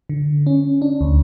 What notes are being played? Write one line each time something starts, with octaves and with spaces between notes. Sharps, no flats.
D3
C#4
D4
D2